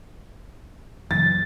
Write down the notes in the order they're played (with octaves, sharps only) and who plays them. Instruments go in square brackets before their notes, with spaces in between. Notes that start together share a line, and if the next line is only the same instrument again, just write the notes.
[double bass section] F#1 [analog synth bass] E3 [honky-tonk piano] A6